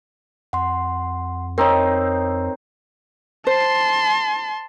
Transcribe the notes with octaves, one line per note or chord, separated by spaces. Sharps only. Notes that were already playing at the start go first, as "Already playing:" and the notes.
F2 F#5 C6
C4 D#4 A#4 C#5
C5 A5 C6